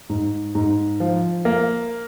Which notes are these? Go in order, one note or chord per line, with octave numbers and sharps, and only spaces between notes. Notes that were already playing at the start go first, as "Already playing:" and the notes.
G#2
G#2
F3
A#3